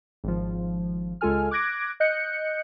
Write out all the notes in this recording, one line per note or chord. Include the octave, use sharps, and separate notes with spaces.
G#1 F3
C#2 G#3 F4 A4 G#5 F6
D6 F#6 G#6 A#6 D7
D#5 F#6 G6 C#7